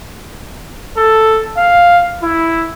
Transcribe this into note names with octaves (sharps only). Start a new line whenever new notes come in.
A4
F5
E4